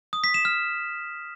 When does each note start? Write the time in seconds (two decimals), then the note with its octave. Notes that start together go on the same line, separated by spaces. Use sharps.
0.13 D#6
0.24 B6
0.34 E7
0.45 F6